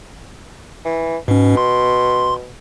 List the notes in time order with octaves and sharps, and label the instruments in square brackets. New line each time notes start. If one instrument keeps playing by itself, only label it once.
[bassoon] E3
[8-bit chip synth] G#2 C#4 [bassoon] B2
[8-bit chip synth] C6